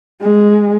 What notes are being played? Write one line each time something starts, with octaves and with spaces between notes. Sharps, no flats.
G#3